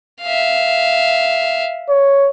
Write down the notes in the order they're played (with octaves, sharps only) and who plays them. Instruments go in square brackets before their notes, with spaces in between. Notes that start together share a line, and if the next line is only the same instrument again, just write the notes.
[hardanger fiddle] E5 F5
[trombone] C#5